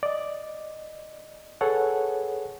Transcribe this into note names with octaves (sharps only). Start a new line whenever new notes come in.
D5 D#5
G#4 A4 B4 C#5 F#5